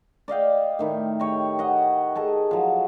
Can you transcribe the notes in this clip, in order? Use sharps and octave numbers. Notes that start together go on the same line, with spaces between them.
D5 D#5 F5 G5
A2 D#3 E4
G4 C#5 D#5
D#5 F#5
G#4 A4 D#5
F3 F#3